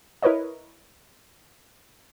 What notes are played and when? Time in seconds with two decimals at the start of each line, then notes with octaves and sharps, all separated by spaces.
0.23 E4 A#4 B4 C#5 D#5